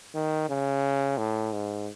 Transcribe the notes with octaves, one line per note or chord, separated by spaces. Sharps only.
D#3
C#3
A2
G#2